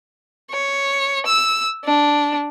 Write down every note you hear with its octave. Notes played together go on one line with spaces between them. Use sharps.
C#5
E6
D4